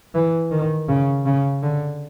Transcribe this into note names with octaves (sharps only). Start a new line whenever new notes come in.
E3
D#3
C#3
C#3
D3